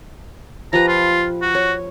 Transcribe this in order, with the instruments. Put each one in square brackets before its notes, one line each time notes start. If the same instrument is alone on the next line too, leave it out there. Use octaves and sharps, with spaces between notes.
[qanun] F3 G4 B4 [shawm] A#5
[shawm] F4
F#4
[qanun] C#5